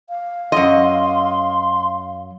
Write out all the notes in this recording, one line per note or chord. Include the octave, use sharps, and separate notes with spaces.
F5
F#2 D#5 C6